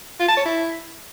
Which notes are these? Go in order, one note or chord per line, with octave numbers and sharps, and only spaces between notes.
F4
A5
C#5
E4